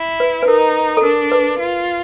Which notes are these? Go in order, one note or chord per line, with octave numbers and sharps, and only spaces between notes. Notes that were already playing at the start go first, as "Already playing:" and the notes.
Already playing: E4
B4
B4
D#4 A#4
A4
D4 A#4
B4
F4